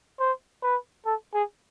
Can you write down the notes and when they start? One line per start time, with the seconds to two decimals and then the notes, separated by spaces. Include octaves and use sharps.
0.19 C5
0.63 B4
1.06 A4
1.34 G#4